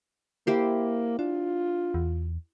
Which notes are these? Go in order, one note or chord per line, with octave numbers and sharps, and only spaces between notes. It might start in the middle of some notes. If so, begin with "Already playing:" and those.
A#3 E4 G4 C5
D4 F4
E2